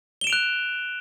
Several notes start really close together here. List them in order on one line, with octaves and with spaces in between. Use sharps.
G7 E7 D7 F7 F#6